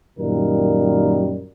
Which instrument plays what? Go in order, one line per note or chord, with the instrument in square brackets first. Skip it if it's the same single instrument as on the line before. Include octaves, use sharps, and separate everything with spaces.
[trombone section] F#2 A#2 D#3 G3 A#4